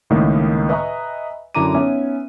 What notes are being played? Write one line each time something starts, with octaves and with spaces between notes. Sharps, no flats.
C#2 A2 D#3 A#3 D#5
B4 D#5 E5 G#5 A#5 C#6
F#2 D3 E4 A#5 D6 D#7
B3 C#4 D#4 E5 G#5